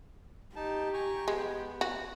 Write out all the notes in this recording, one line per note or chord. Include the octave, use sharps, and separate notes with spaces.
D#4 G4 A5
G#5 A#5 C#6
G#3 B3
F#4